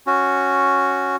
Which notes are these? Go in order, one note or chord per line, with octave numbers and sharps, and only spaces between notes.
C#4 F#4